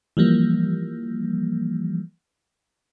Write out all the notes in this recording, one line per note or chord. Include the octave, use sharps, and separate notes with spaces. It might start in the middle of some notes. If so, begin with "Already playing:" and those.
E3 F3 G3 A#3